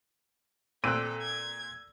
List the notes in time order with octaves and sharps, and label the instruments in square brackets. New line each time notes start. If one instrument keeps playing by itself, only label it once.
[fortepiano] A#2 C4 F#6 [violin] A4 [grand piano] E6 D#7
[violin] G#6